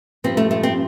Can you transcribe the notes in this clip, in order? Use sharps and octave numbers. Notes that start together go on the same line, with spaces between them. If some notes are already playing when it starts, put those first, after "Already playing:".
G2 F3 C4
A3
A3
C4